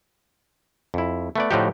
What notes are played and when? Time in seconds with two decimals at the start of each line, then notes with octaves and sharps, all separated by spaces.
0.94 F2 E4
1.36 A3 B3 D5
1.51 A2 D3 F3 D#4 F#4 G4